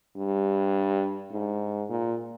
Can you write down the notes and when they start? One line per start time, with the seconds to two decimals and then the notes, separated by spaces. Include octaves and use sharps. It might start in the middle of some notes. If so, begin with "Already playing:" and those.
0.17 G2
1.32 G#2
1.90 A#2